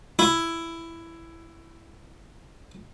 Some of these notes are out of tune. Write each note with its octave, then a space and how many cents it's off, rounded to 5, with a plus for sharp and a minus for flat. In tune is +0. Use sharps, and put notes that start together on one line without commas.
E4 +10